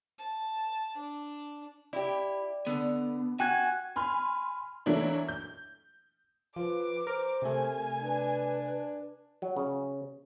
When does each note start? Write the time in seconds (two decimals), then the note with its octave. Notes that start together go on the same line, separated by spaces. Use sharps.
0.18 A5
0.97 D4
1.93 E4 G4 D5
2.67 D3 B3
3.40 F#4 G5 G#5 F#6 G#6
3.96 G#5 B5 C6 F6
4.86 E3 F#3 A3 A#3 D4 E4
5.28 G6
6.56 F3 B4 D6
7.07 A#4 C5
7.42 C3 A3 A#4 G#5
8.02 D4 B4
9.42 F#3
9.56 C#3